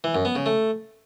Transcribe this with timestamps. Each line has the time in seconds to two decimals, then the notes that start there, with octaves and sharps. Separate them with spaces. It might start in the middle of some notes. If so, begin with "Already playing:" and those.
0.04 E3
0.15 F#2
0.25 B3
0.35 C#3
0.46 A3